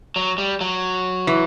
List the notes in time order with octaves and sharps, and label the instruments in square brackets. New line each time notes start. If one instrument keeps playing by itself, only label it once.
[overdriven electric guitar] F#3
G3
F#3
[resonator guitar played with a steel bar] E3